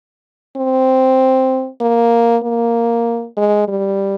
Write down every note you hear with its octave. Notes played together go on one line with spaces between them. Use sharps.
C4
A#3
A#3
G#3
G3